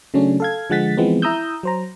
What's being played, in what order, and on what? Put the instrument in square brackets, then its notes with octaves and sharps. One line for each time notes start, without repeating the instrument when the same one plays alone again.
[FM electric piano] C#3 F#3 A3 C#4 D4
A4 F5 G#6
D3 F3 G#3 F#5 A6 B6
E3 F3 G#3 B3 C4
E4 A#5 D#6 E6 G6
F#3 C5 A#5